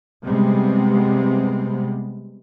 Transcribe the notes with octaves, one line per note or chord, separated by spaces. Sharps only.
C3 G3 G#3 B3 C4